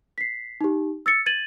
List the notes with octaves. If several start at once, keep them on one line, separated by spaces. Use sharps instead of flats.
B6 C7
D#4 G4
E6 A6 C#7
G#6 A6 D#7 F#7